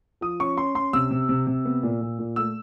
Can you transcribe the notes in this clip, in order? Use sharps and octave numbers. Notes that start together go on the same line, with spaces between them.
F3 D#6
C#4 C#6
C#4 C6
C#4 C6
C3 E6
C3
C3
C3
B3
A#2
A#2
A#2
A3 E6